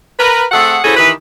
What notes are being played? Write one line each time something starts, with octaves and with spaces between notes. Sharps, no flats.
A#4 B4
A3 C4 G#4 A4 F#5
C#4 E4 F#4 G#4 A4 C5
D#3 E3 G4 B4